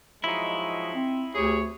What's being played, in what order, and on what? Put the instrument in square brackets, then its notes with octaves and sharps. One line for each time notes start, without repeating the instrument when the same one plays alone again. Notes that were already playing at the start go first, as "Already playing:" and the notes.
[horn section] F3 F#3 G#3 [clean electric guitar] D#4 E4
[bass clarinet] C4
[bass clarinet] D2 [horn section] G4 G#4 C#5